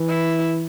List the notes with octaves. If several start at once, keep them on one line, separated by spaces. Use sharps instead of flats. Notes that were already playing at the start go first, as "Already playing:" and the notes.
Already playing: E3
E4